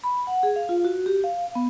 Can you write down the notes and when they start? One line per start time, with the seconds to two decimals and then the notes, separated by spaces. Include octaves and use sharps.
0.04 B5
0.27 F#5
0.43 G#4
0.56 F5
0.69 F4
0.85 F#4
1.06 G4
1.24 F5
1.55 B3